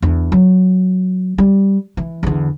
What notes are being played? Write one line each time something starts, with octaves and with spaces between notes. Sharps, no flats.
E2 D4
F#3
G3
E3
E2 D3